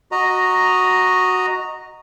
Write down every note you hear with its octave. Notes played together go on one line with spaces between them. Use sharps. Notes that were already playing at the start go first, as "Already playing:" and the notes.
F#4 D#5 A#5